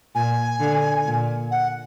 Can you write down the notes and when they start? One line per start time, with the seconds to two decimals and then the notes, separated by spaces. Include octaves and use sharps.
0.15 A#2 G#5
0.60 D3
1.06 A#2
1.51 F#5